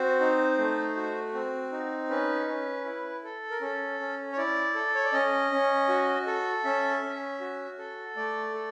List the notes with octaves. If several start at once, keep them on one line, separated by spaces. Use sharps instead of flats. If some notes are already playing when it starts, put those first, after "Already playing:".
Already playing: C4 F#4 C5
D#4
A3
F#4
C4
D#4
C#4 B4
C#4
E4
A4
A#4
C#4 A4
C#4
C#5
E4 D5
A4
C#5
D5
C#4 D#5
C#4
F#4
A4
C#4 E5
C#4
F#4
A4
A3 D5
A4